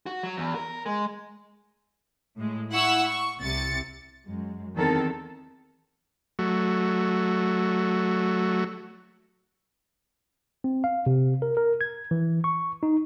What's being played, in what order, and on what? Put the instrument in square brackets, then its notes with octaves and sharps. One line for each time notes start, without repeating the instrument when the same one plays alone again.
[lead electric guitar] F#4
F#3
E2
A#4
G#3
[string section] A2 G#3
E4 F#5 C#6 E6
C#6
C2 C3 A6 C#7
[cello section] F#2 G#3
E2 D#3 E3 C4 A4 A#4
[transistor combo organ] F#3 A3 F#4
[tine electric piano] C4
F5
C3
A#4
A#4
G#6
E3
C#6
D#4